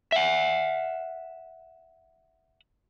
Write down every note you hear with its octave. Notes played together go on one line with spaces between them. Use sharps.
E5 F#5